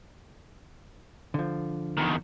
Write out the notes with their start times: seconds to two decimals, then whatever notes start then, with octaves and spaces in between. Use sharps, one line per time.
1.34 D3 F3
1.97 E2 D#3